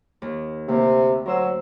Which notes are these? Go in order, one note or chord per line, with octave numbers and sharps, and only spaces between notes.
D#2
D2 C3 A#3
F#3 A#4 C5 E6